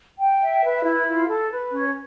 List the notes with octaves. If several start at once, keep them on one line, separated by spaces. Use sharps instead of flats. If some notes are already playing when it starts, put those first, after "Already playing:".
G5
E5
B4
E4
F4
A4
B4
C#4